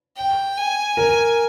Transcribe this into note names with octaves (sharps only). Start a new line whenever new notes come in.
G5
G#5
A#4